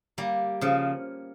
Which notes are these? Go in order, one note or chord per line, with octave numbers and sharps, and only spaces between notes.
G3 A#3
C#3 F3